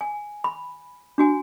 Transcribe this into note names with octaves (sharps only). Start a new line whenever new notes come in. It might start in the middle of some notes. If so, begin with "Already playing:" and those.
G#5
B5
D4 F#4 G#5